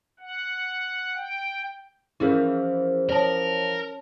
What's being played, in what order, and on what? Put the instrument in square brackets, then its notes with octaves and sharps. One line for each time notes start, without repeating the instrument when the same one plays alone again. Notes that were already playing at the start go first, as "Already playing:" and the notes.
[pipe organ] F#5
G5
[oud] E3 F3 [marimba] C#4 [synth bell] E4 G#4 A#4
[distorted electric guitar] A#4 [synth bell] C#5 A5